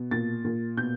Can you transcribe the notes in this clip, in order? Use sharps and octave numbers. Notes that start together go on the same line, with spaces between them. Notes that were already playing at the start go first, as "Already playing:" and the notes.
Already playing: B2
A#2 A6
A#2
B2 G6